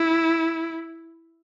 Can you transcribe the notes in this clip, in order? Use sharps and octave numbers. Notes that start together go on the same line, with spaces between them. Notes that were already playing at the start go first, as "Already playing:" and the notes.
Already playing: E4